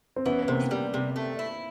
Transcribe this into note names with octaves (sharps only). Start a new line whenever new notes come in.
C4
E3 B3 C#4
B3
C3 A#3 C4
G3
C3
A3
E4